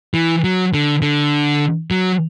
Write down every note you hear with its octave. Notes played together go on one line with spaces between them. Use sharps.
E3
F#3
D3
D3
F#3